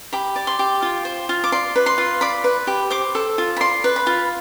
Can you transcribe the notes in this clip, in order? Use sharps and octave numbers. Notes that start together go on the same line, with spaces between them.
G4 B5
D5
C6
G4
F4
C5
F4
D6
D5 C6
B4
C6
F4
D5 B5
B4
G4
C5 D6
A4
F4
B5
D5 C6
B4
B5
F4